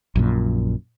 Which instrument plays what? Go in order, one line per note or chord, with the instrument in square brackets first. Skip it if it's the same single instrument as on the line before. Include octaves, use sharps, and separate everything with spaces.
[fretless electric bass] A#1 F#2 A#2